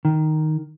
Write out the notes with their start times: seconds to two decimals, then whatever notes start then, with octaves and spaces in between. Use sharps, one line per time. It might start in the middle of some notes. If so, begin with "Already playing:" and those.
0.05 D#3